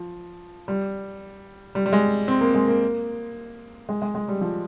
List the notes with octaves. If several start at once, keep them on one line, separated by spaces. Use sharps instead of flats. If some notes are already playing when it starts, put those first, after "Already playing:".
Already playing: F3
G3
G3
G3
G#3
C4
A#3
G#3
A#3
G#3
G#3
G#3
G3
F3